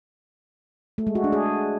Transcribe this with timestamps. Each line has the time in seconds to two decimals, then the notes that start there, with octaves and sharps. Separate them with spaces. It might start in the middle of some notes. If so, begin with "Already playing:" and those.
0.98 A3
1.07 G#3
1.15 F#4
1.24 D4
1.32 G#4